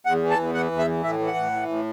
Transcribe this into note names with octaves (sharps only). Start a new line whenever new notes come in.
E2 F#5
E3
A5
E2
E3 F#5
E2
E5
E3
A2 E5
E3
F#5
A2
E3
A2